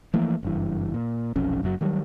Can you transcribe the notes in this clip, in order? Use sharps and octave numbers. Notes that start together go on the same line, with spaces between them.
E3 F3 A3 A#3
F#1 G2 E3
A#2
F1 B1 F2 C#4
F#1 F#2 A2 F#3
D#3 F#3 G3